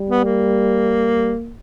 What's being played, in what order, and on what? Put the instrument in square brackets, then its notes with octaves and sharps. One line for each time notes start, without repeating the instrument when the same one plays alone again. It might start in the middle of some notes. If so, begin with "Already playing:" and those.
Already playing: [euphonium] G3
[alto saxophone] B3
A#3